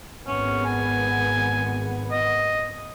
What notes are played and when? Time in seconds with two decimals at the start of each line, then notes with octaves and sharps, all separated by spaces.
0.27 G#1 B3 C#4
0.65 G#5
2.11 D#5